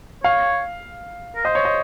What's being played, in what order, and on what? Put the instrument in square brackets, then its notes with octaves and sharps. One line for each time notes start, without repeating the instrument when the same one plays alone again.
[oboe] C#5 [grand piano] F5
[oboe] A#4
[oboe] C5 [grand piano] D#5
[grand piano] C#5
D#5